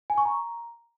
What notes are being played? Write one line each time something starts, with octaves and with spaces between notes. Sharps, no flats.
G#5
C#6
A#5